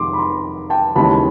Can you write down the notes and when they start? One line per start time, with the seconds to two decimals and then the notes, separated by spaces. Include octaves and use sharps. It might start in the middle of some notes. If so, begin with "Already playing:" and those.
Already playing: F2 C3 D#3 G#3 C6 D6
0.13 B5
0.18 A#5 C6
0.70 G5 A5
0.96 D#2 C#3 E3 G#3 A5 B5